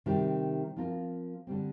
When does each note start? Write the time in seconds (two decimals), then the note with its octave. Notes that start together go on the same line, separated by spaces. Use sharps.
0.06 C3 D#3 G3 C4 G4
0.76 F3 C4 F4 A#4
1.47 D3 G3 C4